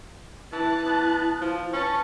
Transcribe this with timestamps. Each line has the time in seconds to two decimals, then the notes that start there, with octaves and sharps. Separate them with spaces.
0.53 E3 E4 A5 F#6
0.86 B3
1.41 F3
1.73 C#4 B4 A5